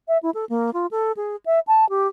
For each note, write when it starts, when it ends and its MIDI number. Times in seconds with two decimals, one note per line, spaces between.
0.08 0.18 76
0.23 0.30 64
0.34 0.45 69
0.49 0.70 58
0.74 0.87 65
0.91 1.12 69
1.17 1.36 68
1.46 1.60 76
1.67 1.88 81
1.89 2.07 67